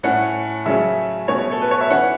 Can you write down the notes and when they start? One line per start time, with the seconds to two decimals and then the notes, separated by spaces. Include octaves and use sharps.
0.03 A2 A3 C#4 F#5
0.66 C#3 F#3 A3 C#4 E5
1.28 B2 A3 C#4 C#5
1.51 A4
1.61 B4
1.71 C#5
1.81 E5
1.90 E3 C#4 F#5